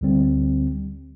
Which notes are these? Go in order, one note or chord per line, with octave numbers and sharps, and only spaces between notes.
D2 D3 G3 C4